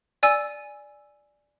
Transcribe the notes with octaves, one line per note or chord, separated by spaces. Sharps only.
D5 G#5 E6